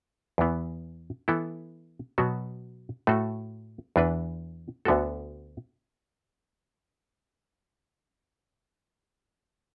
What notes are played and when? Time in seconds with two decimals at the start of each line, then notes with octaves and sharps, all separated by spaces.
0.38 E2 E3 B3
1.28 E3 B3 E4 A4
2.18 B2 F#3 B3 F#4
3.07 A2 A3 F#4 A4
3.96 E2 E3 D4 B4
4.85 D2 D3 B3 F#4 A4